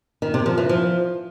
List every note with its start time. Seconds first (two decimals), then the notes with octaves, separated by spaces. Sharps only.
0.22 D#3
0.34 C3
0.46 F3
0.58 E3
0.69 F3